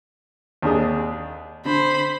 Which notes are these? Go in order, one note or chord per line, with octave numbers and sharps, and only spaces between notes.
D#2 D4 G#4
D3 C5 B5